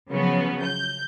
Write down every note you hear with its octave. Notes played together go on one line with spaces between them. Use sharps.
C#3 F3 F#3 B3
G6